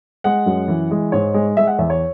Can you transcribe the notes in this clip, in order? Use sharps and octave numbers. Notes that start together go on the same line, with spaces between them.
G#3 F#5
F#2
E3
G#3
G#2 C#5
G#3
G#3 E5
F#5
E2 E5
C#5